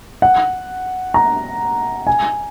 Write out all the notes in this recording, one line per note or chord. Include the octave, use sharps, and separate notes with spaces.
F#5
A#5
G#5